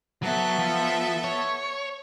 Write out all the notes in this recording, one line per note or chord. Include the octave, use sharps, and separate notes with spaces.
F#3 B3 A4 E5
F3
C#5